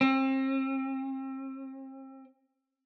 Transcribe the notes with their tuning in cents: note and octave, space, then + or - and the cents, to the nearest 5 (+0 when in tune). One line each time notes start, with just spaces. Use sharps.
C4 +35